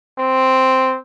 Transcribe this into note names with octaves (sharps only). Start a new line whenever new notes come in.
C4